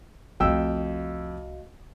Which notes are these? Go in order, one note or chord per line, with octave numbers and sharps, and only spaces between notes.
C2 F2 A3 F#4 D#5 F5 G5 E6